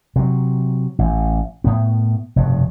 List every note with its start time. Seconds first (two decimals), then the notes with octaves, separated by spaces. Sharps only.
0.16 C3 F#3
0.99 A1
1.64 A2 B3
2.36 F1 G2 B2